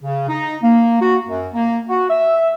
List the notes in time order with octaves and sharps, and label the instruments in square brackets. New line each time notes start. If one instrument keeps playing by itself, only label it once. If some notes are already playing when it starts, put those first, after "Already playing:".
[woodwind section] C#3
D#4
A#3
F#4
F#2
A#3
F#4
E5